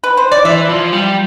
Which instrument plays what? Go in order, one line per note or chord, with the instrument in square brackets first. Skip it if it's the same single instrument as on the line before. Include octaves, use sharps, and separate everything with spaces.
[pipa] B4
C5
D5
[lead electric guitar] E3 [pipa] E5
[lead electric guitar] F3
G3